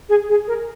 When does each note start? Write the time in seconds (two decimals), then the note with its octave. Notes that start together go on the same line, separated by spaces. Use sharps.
0.09 G#4
0.29 G#4
0.47 A#4